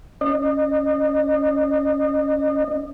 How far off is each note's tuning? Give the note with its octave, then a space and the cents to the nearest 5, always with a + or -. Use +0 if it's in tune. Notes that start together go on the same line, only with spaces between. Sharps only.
C#4 +0 D#5 -35